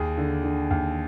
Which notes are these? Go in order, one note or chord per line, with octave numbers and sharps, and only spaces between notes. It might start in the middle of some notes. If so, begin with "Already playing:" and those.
Already playing: D#2 G#4
D3
D3
D#2